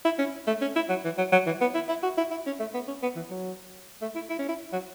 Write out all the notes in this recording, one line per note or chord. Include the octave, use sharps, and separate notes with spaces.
E4
C#4
A3
C#4
E4
F#3
E3
F#3
F#3
E3
B3
E4
E4
F#4
E4
E4
C#4
A3
B3
C#4
B3
E3
F#3
A3
E4
E4
C#4
E4
F#3